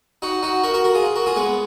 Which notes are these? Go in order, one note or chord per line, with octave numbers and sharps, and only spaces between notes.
D#4 F#4
D#4 F#4
F#4 A#4
F#4 A#4
F#4 A#4
F4 G#4
F#4 A#4
F4 G#4
G#3 B3